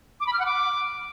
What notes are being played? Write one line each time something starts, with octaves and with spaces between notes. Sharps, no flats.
D6
B5
F6
F#5
D6